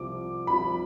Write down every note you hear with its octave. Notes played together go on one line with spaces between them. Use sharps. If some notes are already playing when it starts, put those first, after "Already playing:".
Already playing: C2 C3 F3 D6
C2 C3 F3 B5